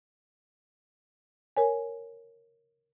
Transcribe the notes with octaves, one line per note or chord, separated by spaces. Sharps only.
A#4 C#5 G#5